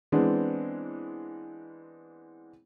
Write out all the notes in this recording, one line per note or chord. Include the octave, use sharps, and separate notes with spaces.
E3 G#3 B3 C4 D4